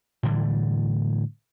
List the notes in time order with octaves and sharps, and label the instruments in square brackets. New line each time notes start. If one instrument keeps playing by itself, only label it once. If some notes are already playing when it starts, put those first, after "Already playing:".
[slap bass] A2 D3 E3 G3